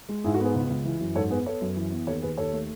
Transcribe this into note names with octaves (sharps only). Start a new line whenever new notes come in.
G#3
G#2 E4 G#4
F#4 A4
B3 G#4 B4
C#2
C#2
E3
F#2
G#2 A4 C#5
B3 G#4 B4
B3 A4 C#5
F#2
E3
B3
D#2 A4 C#5
D#2 G#4 B4
D#2 A4 C#5
A3